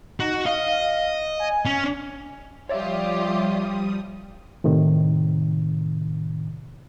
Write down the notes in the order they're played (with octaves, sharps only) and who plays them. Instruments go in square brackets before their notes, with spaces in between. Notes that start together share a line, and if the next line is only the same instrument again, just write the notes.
[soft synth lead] D#4 [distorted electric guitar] F#4
[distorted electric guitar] D#5 [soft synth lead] F5
[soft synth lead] G#5
[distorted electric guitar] C#4
[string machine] F3 G3 D#6 [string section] F4 G4 [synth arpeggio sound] C#5 D5 E5
[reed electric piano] A2 C3 D#3